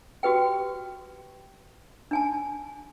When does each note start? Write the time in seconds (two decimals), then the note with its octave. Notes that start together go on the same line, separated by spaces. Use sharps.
0.23 F#4 G4 B4 G5
2.11 D4 G#5 A5